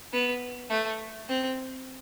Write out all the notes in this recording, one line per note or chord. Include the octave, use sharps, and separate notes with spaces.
B3
A3
C4